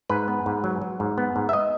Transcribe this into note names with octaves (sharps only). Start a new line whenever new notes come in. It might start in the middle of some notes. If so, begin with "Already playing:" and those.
G#2 B4
B3
G#2
F#3
F#3
G#2
B3
G#2
E5
D#5